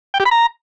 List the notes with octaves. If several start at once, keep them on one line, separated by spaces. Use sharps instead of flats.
G5
G4
B5
A#5